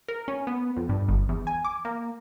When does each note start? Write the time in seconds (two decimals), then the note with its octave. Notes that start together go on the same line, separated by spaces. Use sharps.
0.08 A#4
0.28 C#4
0.47 B3
0.77 F2
0.89 G2
1.08 G1
1.29 E2
1.47 G#5
1.65 D6
1.85 A#3